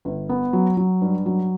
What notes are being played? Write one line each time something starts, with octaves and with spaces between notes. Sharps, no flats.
G1
B3
F#3
F#3
G2
F#3